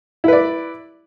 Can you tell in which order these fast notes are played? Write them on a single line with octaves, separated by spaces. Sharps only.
E4 B4 D5